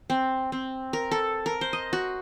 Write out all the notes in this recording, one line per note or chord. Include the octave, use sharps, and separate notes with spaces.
C4
C4
A#4
A4
A#4
C5
D#5
F#4